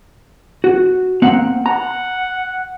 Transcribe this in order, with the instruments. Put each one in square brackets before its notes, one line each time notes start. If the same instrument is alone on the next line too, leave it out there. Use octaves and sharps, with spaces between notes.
[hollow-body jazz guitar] F#4
A#3 C4 F#5
[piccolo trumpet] F#5 [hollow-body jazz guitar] A#5